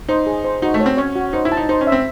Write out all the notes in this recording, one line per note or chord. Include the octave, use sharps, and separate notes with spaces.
D#4 C5
G#4
C5
D#4 F#4
A3
C#5
C4
C#4 C#5
F#4
D#4 C5
E4
A5
D#4
D#4 C5
C#4
E5
C4